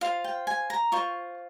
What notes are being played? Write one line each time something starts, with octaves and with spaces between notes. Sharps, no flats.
F4 C5 F5
G5
G#5
A#5
F4 C5 C#6